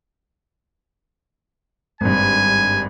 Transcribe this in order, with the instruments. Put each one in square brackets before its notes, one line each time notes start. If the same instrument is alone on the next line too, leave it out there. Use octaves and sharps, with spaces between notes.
[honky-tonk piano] G#1 G2 [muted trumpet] G#5